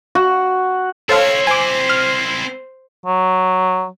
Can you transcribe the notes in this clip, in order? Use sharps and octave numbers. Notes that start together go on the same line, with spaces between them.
F#4
C4 E4 A4 C5 C#5 F5
C5 G#5 D6
F6
F#3